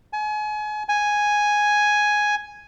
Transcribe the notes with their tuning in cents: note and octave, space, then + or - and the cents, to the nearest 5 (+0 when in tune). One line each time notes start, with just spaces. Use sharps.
G#5 +35
G#5 +0